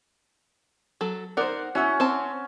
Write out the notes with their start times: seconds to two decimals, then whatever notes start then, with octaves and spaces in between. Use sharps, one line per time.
1.01 F#3 A4
1.37 D#4 A#4 C5 D5 F#5
1.75 C#4 E4 F#4 F#5 E6
2.00 C4 A5